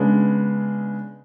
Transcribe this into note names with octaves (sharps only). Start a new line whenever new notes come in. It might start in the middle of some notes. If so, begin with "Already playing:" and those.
Already playing: C#3 G#3 B3 D4 G#4